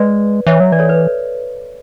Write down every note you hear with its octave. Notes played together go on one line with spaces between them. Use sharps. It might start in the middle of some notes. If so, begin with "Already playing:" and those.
Already playing: G#3 B4 D5
E3 C#5 E5
F#3
E3 D5
A4 C#5
B4